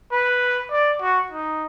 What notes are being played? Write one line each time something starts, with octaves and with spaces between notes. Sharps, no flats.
B4
D5
F#4
D#4